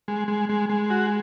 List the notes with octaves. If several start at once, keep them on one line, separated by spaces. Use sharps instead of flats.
G#3
G#3
G#3
G#3
F#4